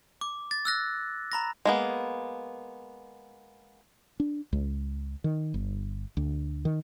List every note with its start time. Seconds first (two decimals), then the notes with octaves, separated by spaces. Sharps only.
0.21 D6
0.51 A6
0.65 E6 F#6 A#6
1.32 A#5 B5 A#6
1.65 G#3 A#3 B3
4.20 D4
4.53 C#2
5.24 D#3
5.54 G1
6.17 D2
6.65 D#3